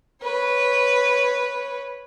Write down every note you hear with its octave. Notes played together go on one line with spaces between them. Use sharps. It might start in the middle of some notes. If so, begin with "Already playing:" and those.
B4 C#5